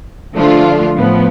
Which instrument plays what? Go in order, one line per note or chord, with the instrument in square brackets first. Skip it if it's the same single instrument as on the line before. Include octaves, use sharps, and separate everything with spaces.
[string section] D3 F3 A3 D4 F4
A2 F3 B3